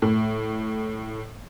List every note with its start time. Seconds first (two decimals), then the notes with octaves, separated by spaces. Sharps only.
0.02 A2